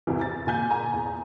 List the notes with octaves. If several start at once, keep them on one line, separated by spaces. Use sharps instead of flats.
E2 C3 E3
A6
A#2 G#5 G6
G#5 A#5
E2